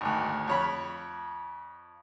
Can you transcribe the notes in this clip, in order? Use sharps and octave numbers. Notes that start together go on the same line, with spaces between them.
G#1 D2
F2 C#5 B5